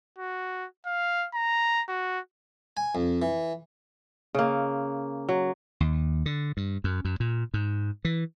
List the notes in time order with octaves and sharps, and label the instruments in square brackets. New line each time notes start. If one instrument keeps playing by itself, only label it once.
[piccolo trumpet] F#4
F5
A#5
F#4
[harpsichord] G#5
F2
E3
[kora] C#3 A#3
F#3
[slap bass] D#2
D3
G2
F#2
F#2
A#2
G#2
E3